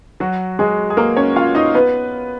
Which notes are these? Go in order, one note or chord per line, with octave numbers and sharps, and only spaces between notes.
F#3 F#4
G#3 G#4
G#4
A#3 A#4
C#4 C#5
F4 F5
D#4 D#5
B3 B4